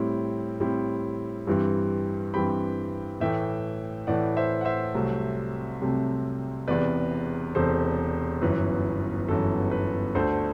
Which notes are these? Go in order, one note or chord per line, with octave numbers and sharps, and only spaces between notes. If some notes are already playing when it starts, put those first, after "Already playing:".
Already playing: A2 G3 C4 E4 G5
A2 G3 C4 E4
G2 E3 G3 C4
G2 E3 G3 C4 G5 B5
A2 E3 A3 E5 G5
A2 E3 A3 D5 F#5
C5 E5
F#5
C5 E5
C2 C3 F#3 A3
C2 C3 F#3 A3
E1 E2 C3 B4 D5
E1 E2 C3 A4 C5
G1 F#2 E3 B4
G1 F#2 E3 A4
B4
D2 D3 A3 D4 A4 C5